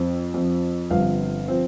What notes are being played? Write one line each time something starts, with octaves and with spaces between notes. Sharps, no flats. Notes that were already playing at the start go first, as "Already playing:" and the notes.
Already playing: F2 F3 C4
F2 F3 C4
G1 G2 F3 C4 F5
F3 C4